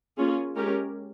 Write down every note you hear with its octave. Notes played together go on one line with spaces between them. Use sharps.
A#3 C#4 F4 G#4
G#3 C#4 G4 A#4